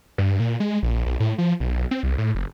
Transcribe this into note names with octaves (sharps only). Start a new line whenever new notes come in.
G2
A#2
G#3
A#1
B1
A2
F3
B1
C4
C2
A2
F#1